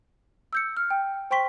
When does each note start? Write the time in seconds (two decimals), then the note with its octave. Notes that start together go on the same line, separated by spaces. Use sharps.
0.53 E6 G6 C#7
0.77 F6
0.90 G5
1.31 C5 G5 C6 C#6 B6 G7